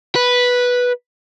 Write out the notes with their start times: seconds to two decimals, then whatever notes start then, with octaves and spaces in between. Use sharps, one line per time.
0.16 B4